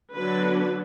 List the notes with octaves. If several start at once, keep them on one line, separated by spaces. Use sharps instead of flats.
D3 F#3 B3 D4 B4